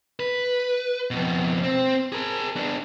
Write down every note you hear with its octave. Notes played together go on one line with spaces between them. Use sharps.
B4
F2 B2
C4
G#4 A#4
B3 D4